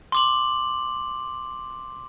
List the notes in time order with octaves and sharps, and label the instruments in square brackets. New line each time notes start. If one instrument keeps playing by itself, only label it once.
[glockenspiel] C6 D6 F#7